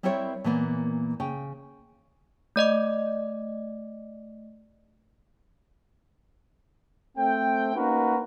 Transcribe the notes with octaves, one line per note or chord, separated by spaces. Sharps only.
G3 C4 E4 A#4 C#5 E5
A#2 E3 A#3 B3
C#3 G5
A3 D5 D#5 D6
A3 C4 G5
A#3 C#4 D#4 F#4 A#4 B4